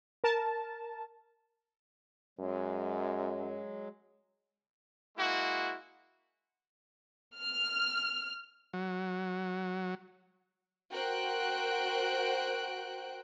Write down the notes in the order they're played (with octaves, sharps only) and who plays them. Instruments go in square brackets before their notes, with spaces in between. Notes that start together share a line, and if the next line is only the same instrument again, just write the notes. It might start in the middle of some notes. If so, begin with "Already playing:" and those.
[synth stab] A#4 A5
[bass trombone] F#2 [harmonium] F#3 G#3
[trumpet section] G#3 A#3 E4 F#4
[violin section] F6
[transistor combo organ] F#3
[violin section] F#4 A#4 C5 G5 F#6 D7